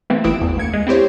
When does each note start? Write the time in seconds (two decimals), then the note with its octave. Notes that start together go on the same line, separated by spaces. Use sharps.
0.10 E3 A3 A#3 C4
0.24 G#1 E3 E4 D#6 D7 E7
0.41 E2
0.57 D2 A#3 G#6 C#7
0.73 G#3
0.87 C4 E4 G4 C5 C#5